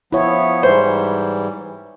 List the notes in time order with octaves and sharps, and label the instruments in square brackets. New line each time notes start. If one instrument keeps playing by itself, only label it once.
[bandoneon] F3 B3 [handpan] E4 C#5
[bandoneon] G#2 E3 G3 [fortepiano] C5